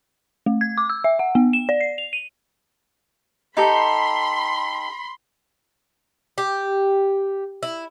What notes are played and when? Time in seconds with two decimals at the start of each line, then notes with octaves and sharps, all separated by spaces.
0.46 A3
0.61 G#6
0.78 D6
0.90 E6
1.04 E5
1.19 F#5
1.35 B3
1.53 E7
1.69 D5
1.81 C7
1.98 F7
2.13 D#7
3.57 D#4 G4 A4 B5 C6
6.38 G4
7.63 E4